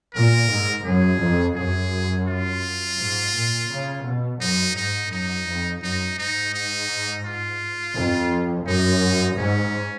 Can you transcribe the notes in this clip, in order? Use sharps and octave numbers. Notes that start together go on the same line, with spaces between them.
A#2 A#4
G#2
F#2 G#4
F2
F#2 G#4
F4
G#2
A#2
C#3
B2
F#2 D#4
G#2 D#4
F#2 D#4
F2
F#2 D#4
G#2 D#4
D#4
F4
F2
F#2 D#4
G#2 C#4